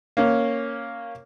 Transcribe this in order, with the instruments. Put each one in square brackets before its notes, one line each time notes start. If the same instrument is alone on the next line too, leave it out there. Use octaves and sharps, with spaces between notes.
[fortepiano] A#3 C#4